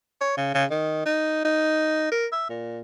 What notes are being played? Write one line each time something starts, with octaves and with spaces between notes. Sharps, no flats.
C#5
C#3
C#3
D#3
D#4
D#4
A#4
E5
A#2